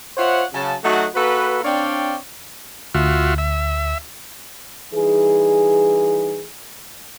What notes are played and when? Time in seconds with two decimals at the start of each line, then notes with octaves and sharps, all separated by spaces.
0.17 F4 C5 C#5 E5 F#5
0.54 C#3 F#3 A5
0.84 F#3 A3 D#4 F#4
1.15 A#3 F#4 A4 B4
1.64 C4 D4 C#5 D5 F5 G5
2.94 D2 F4 F#4 E5
3.38 E5
4.94 E3 G3 D#4 G#4